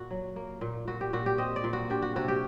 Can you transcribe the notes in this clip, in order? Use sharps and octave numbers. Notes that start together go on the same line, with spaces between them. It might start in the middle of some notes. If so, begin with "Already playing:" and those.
Already playing: A#2 A#3 F#4
F#3
A#3
A#2
A#2 F#4
G4
A#2 F#4
G4
C4 D#5
D5
A#2
F#4
D4 G4
F#4
C3 F#4
G4